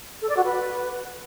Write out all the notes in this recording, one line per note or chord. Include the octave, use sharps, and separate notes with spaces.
A4
D5
F#4
B4